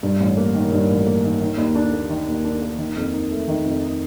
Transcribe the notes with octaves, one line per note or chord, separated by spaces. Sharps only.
G2
A1
A#3
D#3
G2
A1
A#3
D#3
D#3
D#2
D4
A#3
D#3
D#2
D4
A#3
D#3
F2
D#4
A3
D#3
F2
D#4